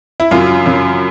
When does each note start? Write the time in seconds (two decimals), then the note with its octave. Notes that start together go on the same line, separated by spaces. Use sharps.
0.20 E4
0.31 F#2 C#3 F#3 F4
0.66 F#2 C#3 F#3